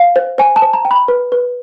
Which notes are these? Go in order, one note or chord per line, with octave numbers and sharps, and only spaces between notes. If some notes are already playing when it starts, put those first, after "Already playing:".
Already playing: F5
C5
C5 G#5
A5
C5
A#5
G5
B5
B4
B4